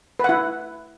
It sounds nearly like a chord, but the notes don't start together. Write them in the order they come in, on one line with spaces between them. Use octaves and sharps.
B4 F#5 E4